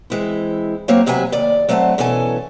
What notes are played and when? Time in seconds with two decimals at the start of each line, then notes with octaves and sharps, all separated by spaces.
0.10 E3 G#3 C4 E4
0.88 F#3 A3 A#3 C4 C5 C#5
1.06 D#2 C3 F#3 B4 E5 G#5
1.32 D#2 D5
1.69 F#3 A3 C4 C#5 F#5 A5
1.98 B2 E3 C#4 A4 G#5